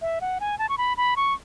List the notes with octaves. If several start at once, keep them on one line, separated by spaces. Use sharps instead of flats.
E5
F#5
G#5
A5
C#6
B5
B5
C#6